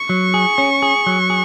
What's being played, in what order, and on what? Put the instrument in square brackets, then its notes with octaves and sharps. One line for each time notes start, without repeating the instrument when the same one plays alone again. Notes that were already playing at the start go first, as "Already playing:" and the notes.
Already playing: [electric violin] C#6
[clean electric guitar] F#3
G#4
C#4
G#4
F#3
G#4